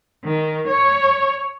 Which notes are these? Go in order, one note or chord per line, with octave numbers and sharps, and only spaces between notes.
D#3
C#5